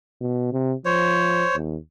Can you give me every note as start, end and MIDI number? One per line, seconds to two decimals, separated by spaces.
0.21 0.50 47
0.53 0.74 48
0.85 1.44 53
0.85 1.56 72
0.85 1.56 73
1.55 1.76 39